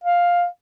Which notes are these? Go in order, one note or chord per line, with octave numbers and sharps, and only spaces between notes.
F5